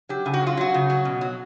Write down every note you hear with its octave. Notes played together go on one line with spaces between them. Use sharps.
F#3 G4
C#3
F#4
F#3
F4
F#3 F#4
C#3
F#3
B2
F#3